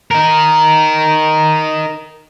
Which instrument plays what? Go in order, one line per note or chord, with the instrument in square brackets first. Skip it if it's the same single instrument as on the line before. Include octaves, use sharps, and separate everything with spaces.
[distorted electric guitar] D#4 A#4